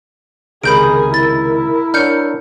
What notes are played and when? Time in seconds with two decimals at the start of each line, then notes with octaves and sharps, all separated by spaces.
0.64 C#2 C3 D#3 G#4 A#4 B5 G6 D7
1.14 E4 A6
1.94 D4 C#5 F#5 F6 G6 C#7